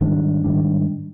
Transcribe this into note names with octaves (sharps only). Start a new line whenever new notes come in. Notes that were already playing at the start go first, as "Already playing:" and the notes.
G#2 D#3 G3 D4
G#2 D#3 G3 D4